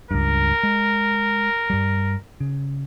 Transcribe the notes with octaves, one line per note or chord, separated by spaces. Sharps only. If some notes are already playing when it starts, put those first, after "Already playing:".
C#2 G2 A#4
G#3
G2 G3
C#3